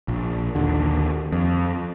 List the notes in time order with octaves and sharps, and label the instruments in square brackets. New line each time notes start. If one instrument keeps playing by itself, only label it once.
[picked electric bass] A#1
D#2 D3
F2